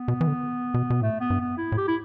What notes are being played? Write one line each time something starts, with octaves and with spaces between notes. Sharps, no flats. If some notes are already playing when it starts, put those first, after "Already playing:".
Already playing: B3
B2
E3
D3
B2
B2
A2 A3
B3
G2
B3
E4
A2
G4
E4